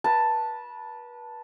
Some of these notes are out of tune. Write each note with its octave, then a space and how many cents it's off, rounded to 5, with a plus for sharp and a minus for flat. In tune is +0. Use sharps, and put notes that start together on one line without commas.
B4 -30 A5 +0